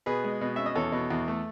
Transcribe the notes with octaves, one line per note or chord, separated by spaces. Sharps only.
B2 G#4 B4
G#3
B2
C#4 E5
D#5
E2 A4 C#5
B2
E2
A3